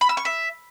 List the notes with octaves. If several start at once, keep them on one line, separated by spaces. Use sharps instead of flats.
B5
E6
C#6
E5